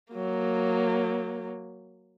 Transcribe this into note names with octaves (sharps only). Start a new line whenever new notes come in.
F#3 A#3